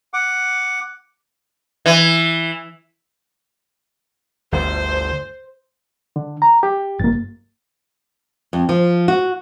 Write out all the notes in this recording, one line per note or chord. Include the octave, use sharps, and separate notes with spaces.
F#5 D6
E3
G1 D2 C5
D3
A#5
G4
G1 C2 A#3 A6
F2
F3
F#4